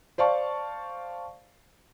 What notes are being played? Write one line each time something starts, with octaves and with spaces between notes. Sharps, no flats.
C5 D5 F5 A5 C#6